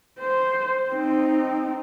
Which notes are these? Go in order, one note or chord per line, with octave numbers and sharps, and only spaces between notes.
C5
C4 D#4